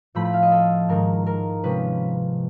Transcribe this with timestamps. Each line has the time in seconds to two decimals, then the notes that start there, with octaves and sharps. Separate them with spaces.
0.15 A2 F3 A3 B5
0.25 B5
0.33 F5
0.43 D#5
0.52 A4
0.89 G#2 D#3 G#3 A#4
1.26 A#4
1.63 C3 F3 G#3 C#4 B4